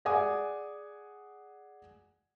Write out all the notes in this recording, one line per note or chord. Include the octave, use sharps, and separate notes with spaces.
G#4 D5 F#5 G#5 D6 D#6